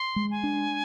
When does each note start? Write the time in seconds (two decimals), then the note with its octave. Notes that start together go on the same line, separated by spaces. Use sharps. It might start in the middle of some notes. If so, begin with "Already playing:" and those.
Already playing: C6
0.16 G#3
0.31 G#5
0.43 D4